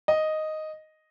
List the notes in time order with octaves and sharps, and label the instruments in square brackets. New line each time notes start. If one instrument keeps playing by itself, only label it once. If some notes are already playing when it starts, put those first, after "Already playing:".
[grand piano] D#5